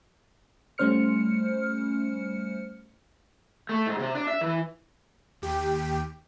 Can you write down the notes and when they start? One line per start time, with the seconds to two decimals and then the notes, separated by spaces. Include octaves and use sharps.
0.78 G3 A3 C#4 C5 F6 C#7
3.69 A3
3.87 G#2
3.99 C3
4.15 D4
4.27 E5
4.41 E3
5.42 D#2 G4